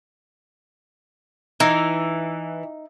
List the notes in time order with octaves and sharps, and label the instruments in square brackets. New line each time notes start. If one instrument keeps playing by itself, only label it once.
[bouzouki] E3 [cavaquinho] D#4